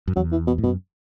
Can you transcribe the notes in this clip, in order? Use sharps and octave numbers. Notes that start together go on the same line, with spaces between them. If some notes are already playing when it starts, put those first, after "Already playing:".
F#2
E2 F#3
E3
B2
A2
F#2 B2